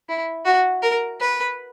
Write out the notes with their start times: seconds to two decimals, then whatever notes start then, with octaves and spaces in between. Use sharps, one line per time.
0.09 E4
0.45 F#4
0.82 A#4
1.20 B4